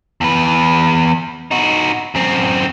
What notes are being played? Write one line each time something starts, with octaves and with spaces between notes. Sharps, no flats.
E2 B4
D#4 F#4
F#2 C4